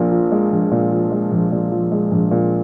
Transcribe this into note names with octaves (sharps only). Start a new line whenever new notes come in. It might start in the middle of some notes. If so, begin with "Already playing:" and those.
Already playing: A#1 A#2
F3
G#3
A#1
A#2
F3
G#3
A#1
A#2
F3
G#3
A#1
A#2